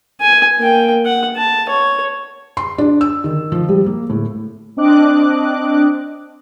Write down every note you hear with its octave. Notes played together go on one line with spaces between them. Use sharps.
G#5
A#3 G5
F#5
A5
C#5
C6
D4
E6
D#3
F3
G3
A#3
A2
C4 D4 D#5 D6 F#6